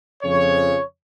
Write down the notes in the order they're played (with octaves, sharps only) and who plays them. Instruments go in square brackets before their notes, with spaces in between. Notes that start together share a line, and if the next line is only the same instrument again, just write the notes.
[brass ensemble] F2 C#3 F3 C#5